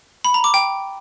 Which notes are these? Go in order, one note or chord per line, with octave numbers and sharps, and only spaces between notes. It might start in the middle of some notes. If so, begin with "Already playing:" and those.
B5
A#5
D6
G5